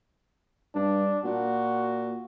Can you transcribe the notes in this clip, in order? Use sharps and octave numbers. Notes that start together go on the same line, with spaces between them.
G2 D4
A#2 F#4